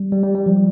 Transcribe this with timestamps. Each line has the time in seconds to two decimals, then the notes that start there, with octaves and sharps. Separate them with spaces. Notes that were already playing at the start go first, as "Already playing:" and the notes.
Already playing: G3
0.12 G3
0.23 G3
0.35 G3
0.46 F3